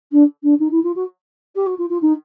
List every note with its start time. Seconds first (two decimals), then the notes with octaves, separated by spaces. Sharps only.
0.12 D4
0.43 D4
0.59 D#4
0.71 E4
0.83 F4
0.95 F#4
1.55 G4
1.66 F#4
1.78 F4
1.89 F4
2.02 D#4